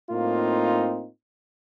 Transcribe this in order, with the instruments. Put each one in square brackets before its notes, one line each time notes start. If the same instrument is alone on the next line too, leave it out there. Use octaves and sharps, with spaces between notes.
[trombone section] A2 A#3 C4 D#4 F4